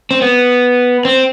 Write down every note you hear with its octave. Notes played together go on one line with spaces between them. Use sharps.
C4
B3
C4